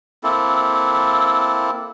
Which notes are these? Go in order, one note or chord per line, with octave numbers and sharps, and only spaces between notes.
A#3 C4 E4 A4